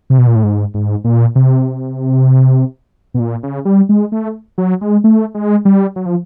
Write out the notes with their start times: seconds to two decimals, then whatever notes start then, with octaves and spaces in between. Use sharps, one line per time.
0.10 C3
0.18 B2
0.27 A#2
0.36 A2
0.44 G#2
0.74 G#2
1.04 A#2
1.35 C3
3.14 B2
3.20 A#2
3.43 C#3
3.65 G3
3.89 G#3
4.12 A3
4.58 F#3
4.81 G#3
5.04 A3
5.35 G#3
5.65 G3
5.96 F#3
6.06 F3